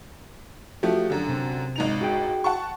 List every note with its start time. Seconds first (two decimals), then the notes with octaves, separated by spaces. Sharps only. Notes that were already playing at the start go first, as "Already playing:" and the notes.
0.83 F3 A3 F#4 G4
1.10 F#2 D3
1.28 C3 C4
1.76 G#1 D#4 F7
2.01 F#4 G#4 G5
2.44 F#5 A5 C#6